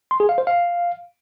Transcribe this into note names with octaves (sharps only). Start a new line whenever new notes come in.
C6
G#4
F5
C5
F5